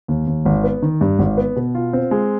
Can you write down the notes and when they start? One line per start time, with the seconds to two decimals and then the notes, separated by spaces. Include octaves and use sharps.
0.08 D#2
0.27 D#2
0.45 G#1
0.64 B3
0.82 D#3
1.01 G2
1.19 G#1
1.37 B3
1.56 B2
1.75 F4
1.93 C4
2.11 G#3